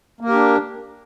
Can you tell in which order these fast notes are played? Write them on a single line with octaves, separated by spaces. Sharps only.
A#3 A#4 G4 D4